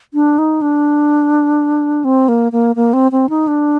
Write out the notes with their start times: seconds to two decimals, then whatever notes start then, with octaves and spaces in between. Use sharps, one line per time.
0.14 D4
0.38 D#4
0.62 D4
2.05 C4
2.29 A#3
2.52 A#3
2.76 A#3
2.93 C4
3.12 C4
3.29 D#4
3.47 D4